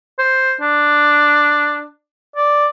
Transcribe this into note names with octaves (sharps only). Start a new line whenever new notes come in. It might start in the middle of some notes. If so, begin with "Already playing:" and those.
C5
D4
D5